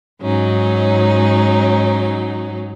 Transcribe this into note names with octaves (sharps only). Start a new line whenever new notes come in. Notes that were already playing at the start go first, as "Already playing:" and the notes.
G#2 F#3 C#4 D#4